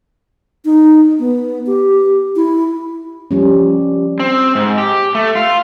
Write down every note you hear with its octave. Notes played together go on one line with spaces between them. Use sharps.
D#4
B3
G4
E4
F3 G3 C#4
C4
G#2
G4
A3
F4